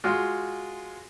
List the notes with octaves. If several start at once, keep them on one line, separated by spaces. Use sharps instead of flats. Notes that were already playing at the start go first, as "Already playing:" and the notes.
G#3 F4 F#4